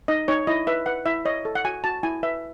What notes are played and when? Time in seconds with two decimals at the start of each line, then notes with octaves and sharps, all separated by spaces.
0.08 D#4 D#5
0.28 D#4 C#5
0.47 E4 D#5
0.67 B4 E5
0.86 B4 F#5
1.06 E4 E5
1.25 C#5 D#5
1.45 A4
1.55 F#5
1.65 F#4 G#5
1.84 F#4 A5
2.03 E4 G#5
2.23 B4 E5